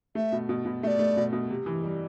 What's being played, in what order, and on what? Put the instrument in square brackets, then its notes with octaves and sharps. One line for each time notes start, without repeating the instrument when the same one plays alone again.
[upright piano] A3 [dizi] E5
[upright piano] B2
B2
B2
[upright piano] A3 [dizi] D5 E5
[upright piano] A3
B2
B2
C3
E3
G3